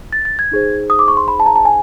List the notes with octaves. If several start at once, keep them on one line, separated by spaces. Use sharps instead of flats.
A6
A6
G#6
D#4 G#4 C5
D#6
D6
C#6
C6
B5
A5
A#5
A5
G#5